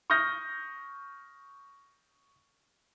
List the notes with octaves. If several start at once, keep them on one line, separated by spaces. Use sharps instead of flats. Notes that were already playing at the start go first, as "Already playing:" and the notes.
C#6 D#6 F6 G6 A#6